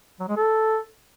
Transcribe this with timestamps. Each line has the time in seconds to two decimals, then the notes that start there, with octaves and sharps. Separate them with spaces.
0.20 F#3
0.28 G#3
0.37 A4